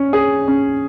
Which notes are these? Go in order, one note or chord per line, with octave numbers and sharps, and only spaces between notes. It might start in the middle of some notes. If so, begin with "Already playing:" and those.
Already playing: C#4
G#4
C#4